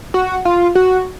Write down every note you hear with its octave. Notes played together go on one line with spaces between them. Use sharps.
F#4
F4
F#4